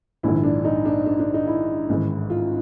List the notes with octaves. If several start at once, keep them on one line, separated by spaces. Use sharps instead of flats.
A#1 G#2 D#3 E4
D4
D#4
D4
D4
D4
D#4
E4
A1 G#2 D#3
F4